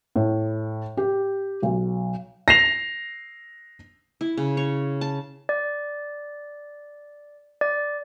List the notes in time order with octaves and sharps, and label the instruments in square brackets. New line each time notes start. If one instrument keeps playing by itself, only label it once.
[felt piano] A2
G4
B1
[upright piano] A#6 C7 F7
[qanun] E4
C#3
C#5
A5
[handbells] D5
D5